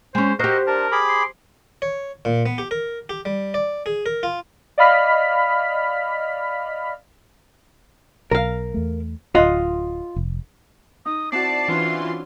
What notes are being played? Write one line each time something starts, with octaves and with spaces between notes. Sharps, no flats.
G#3 C#4 C5
F#4 G4 A#4 C5 D#5
D4 A#4 A5
G#4 B5 D6
C6
C#5
A#2
B3
G4
A#4
G4
G3
D5
G#4
A#4
F4
D5 D#5 F5 B5 F6 B6
B1 A#4 F5
E2 A3
D1 G#1 F4 D#5 F#5
F1
D#4 D#6
C4 E4 F#4 D5 A5 C7
E3 C#4 D4 F4 C6